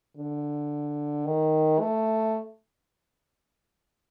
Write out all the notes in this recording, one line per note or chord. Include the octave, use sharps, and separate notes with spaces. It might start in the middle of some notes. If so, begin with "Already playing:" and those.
D3
D#3
A3